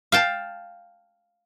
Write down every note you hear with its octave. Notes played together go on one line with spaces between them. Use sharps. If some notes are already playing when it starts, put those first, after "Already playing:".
F5 G5 A5